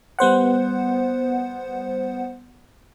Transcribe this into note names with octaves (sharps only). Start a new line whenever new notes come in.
G3 B3 C5 F#5